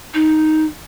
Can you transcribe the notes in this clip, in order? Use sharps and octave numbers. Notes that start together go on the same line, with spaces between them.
D#4